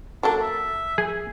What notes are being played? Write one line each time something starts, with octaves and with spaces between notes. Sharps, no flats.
F#3 A#3 D4 A4
E5
G#4